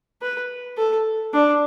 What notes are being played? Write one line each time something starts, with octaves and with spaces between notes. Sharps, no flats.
B4
A4
D4